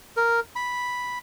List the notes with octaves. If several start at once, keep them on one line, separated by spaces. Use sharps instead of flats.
A#4
B5